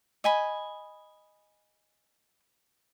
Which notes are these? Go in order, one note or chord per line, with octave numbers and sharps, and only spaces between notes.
D#5 G#5 B5